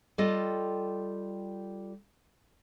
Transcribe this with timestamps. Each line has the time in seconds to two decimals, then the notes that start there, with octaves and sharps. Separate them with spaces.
0.18 G3 F4 A4 D#5